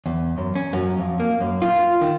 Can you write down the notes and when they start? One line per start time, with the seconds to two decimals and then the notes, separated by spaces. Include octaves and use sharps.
0.06 E2
0.38 F#2
0.55 C#4
0.73 F#2
0.98 F2
1.20 A#3
1.40 F#2
1.62 F4
2.01 D#3